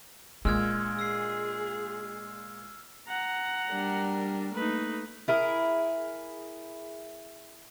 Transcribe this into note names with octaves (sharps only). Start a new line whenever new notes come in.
A#2 G#3 D4 E6 F6 G#6
G#4 E6 C7
F#5 A#5
G3 D4 A#4
A3 A#3 D#4 B4
E4 G#4 A#4